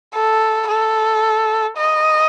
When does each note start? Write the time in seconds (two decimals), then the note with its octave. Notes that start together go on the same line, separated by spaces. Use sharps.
0.14 A4
0.68 A4
1.77 D#5